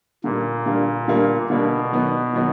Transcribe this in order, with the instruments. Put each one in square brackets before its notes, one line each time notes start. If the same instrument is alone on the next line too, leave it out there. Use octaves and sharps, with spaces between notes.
[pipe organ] A#2 [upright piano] D3 G3 A#3 D4
[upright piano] D3 G3 A#3 D4
D3 G3 A#3 D4
[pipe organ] B2 [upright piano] D3 G3 A#3 D4
[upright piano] D#3 F#3 B3 D#4
D#3 F#3 B3 D#4